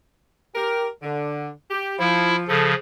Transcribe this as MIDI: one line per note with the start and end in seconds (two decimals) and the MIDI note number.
0.56 0.87 67
0.56 0.87 70
1.03 1.49 50
1.71 1.95 67
1.99 2.43 53
1.99 2.36 64
2.48 2.74 49
2.48 2.74 53
2.48 2.69 69